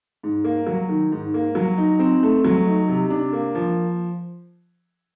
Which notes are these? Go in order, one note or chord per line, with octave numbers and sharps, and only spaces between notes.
G#2
A#3
F#3
D#3
G#2
A#3
F#3
D#4
C4
A3
F#3
D#4
C3
D4
A#3
F3